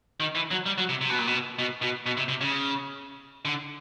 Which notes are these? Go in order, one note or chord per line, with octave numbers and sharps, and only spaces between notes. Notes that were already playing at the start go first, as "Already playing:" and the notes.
D#3
E3
F#3
G3
F#3
C3
C3
B2
A#2
B2
B2
B2
B2
C3
C3
C#3
D3